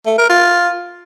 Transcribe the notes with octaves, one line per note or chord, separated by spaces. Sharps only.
A3
A#4
F4